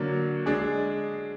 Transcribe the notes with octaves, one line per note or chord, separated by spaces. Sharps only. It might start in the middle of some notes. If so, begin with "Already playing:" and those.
Already playing: D3 F#3 A#3
G#3 D4 G#4